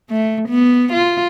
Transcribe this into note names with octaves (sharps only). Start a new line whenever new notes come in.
A3
B3
F4